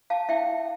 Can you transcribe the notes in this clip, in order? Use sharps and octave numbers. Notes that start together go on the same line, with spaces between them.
F5 A5
E4 E5 G5